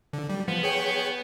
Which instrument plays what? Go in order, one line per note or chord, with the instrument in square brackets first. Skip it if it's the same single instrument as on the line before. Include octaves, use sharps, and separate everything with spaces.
[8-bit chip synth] D3
G3
[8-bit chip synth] F3 [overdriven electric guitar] B3
[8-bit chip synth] G#4 C#5 G5